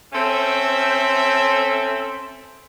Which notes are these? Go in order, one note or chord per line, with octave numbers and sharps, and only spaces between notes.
C4 C#4 A4 C5 E5